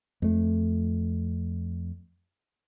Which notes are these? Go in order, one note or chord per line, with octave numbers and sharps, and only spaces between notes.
F2 A3